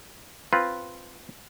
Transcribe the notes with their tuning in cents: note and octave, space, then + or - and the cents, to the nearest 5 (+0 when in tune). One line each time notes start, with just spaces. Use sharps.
C4 +0 F4 +0 B4 +0